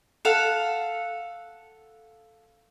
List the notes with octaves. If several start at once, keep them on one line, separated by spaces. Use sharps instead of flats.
A4 F5 F#5